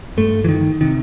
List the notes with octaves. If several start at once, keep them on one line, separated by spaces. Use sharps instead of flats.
G2 A3
E3
D#3
C3 D#3